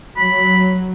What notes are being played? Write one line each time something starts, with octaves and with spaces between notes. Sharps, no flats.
F#3 B5